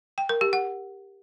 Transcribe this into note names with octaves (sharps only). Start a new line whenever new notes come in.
G5
A#4
G4
F#5